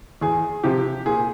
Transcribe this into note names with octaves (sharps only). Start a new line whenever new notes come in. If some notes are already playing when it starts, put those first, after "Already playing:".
E2 G#4
C3 F3 G4
A#2 G#4